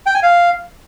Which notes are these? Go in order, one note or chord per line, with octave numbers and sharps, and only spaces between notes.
G5
G#5
F5